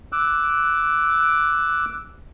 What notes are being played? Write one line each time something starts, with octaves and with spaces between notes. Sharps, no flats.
D6 E6 F#6